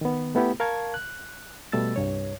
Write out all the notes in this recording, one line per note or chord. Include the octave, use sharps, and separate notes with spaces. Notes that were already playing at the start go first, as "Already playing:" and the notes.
D#3 B3
A3 B3 E4 G4
A#4 F5 A5 C#6 G#6
F#6
B2 G3 A3 E6 A6
C2 G2 C#5